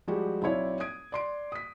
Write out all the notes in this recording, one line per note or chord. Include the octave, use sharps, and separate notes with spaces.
F3 G3 G#3 F#4 G4
B1 C4 E4 C#5 D5
D#6 G#6 D7
D5 C6 D7
D#6 B6